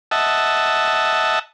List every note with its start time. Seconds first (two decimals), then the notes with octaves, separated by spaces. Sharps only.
0.11 D#5 E5 F#5 A5